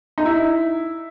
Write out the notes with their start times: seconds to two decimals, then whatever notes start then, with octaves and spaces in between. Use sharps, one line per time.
0.18 D#4
0.25 E4